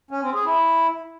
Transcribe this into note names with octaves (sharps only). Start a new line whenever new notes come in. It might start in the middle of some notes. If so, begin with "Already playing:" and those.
C#4
C4
G#4
E4